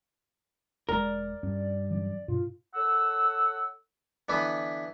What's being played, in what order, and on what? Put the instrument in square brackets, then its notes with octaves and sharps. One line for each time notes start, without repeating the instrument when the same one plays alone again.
[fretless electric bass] E1 G#3 [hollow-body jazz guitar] A#4 [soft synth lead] D5
[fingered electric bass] G2 [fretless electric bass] C#4
[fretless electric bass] E3 F#3 C#4 [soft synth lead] D5
[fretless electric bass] G2 B2 [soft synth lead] F4
[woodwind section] A4 C#5 F#5 E6
[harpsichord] D3 E3 B3 E4